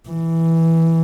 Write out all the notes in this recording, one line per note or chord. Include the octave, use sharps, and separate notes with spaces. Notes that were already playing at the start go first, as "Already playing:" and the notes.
E3